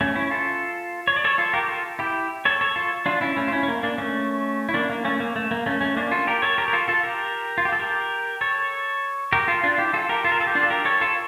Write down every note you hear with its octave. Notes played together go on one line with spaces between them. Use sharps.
A3 C#4
C#4 E4
F4 A4
C#5
D5
A4 C#5
F4 A4
G4 A#4
F4 A4
E4 G4
A4 C#5
A4 C#5
F4 A4
D4 F4
C#4 E4
A3 C#4
F4
C#4 E4
C#4
A#3
A#3 D4
A3 C#4
E4
A#3 D4
A#3
A3 C#4
A#3
A3
A#3
A3 C#4
A3 C#4
A#3 D4
F4 A4
G4 A#4
A4 C#5
G4 A#4
A#4
F4 A4
F4 A4
G4 A#4
F4
G4
A4
G4 A#4
A4 C#5
G4 A#4
F4 A4
D4 F4
E4 G4
F4 A4
G4 A#4
F4 A4
A#4
A4
G4
D4 F4
A4
G4 A#4
A4 C#5
F4 A4